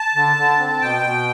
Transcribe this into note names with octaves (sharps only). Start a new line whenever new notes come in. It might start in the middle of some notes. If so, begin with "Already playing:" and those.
Already playing: A5
D3
D3
C4
B2 G5
B2